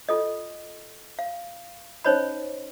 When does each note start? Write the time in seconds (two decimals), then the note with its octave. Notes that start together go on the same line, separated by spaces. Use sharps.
0.09 F4 A4 D#5
1.19 F5
2.05 C#4 D#4 C5 C#5 D#5 B5